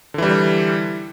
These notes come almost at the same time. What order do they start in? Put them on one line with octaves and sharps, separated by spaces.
D3 E3 G3